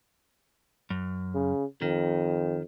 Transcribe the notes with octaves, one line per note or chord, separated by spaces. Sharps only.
F#2
C#3
F2 D#3